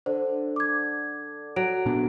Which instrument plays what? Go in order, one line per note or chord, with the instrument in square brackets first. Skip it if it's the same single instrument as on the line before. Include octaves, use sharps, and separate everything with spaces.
[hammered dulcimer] D3 [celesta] C5
[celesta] D6 G#6
[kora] F#3 [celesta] D7
[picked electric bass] A#2 B3 D4